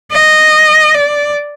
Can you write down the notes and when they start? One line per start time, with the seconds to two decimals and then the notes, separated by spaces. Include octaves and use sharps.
0.12 D#5
0.94 D5